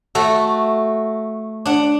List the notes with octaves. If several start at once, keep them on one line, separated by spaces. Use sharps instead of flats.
A3 F#4 A4
D4 F#5